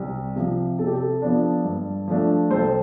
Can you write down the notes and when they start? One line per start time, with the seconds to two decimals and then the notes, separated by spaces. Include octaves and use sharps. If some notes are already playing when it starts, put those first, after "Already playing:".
Already playing: C2
0.36 C3 F3
0.79 C3 A4
0.87 G4
0.95 A4
1.22 F3 B3 D4
1.65 G2
2.08 F3 A3 D4
2.51 C2 A4 C5